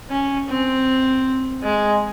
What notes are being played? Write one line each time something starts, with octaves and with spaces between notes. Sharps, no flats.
C#4
C4
G#3